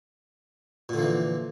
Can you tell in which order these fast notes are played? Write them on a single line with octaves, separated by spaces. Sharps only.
A#2 D3 F3 E3